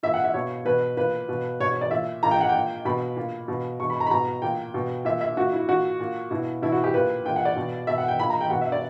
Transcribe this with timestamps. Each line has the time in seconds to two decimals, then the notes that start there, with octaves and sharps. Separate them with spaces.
0.03 A#2 E5
0.14 F#5
0.24 E5
0.34 B2 C#5
0.65 B2 B4
0.97 A#2 B4
1.29 B2
1.60 B2 C#5
1.71 C#5
1.81 D5
1.91 A#2 E5
2.23 A#2 A#5
2.31 G5
2.41 F#5
2.49 G5
2.54 A#2
2.85 B2 B5
3.16 A#2
3.48 B2
3.80 B2 C#6
3.90 B5
4.00 A#5
4.06 B5
4.11 B2 A#5
4.42 A#2 G5
4.74 B2
5.05 A#2 E5
5.21 E5
5.37 A#2 F#4
5.53 E4
5.69 A#2 F#4
6.00 A#2
6.31 B2 E4
6.62 B2 E4
6.72 F#4
6.84 G4
6.94 A#2 B4
7.26 A#2 G5
7.36 F#5
7.45 D5
7.56 B2
7.87 B2 E5
7.98 F#5
8.08 G5
8.19 A#2 B5
8.30 A#5
8.41 G5
8.50 B2 F#5
8.61 E5
8.72 D5